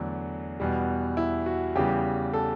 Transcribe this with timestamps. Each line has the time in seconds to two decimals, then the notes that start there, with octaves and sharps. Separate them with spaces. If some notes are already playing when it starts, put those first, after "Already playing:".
Already playing: E2 D3 F#3 A3 D4
0.60 E2 B2 G3
1.17 E4
1.46 F#4
1.75 E2 C#3 E3 G3 G4
2.33 A4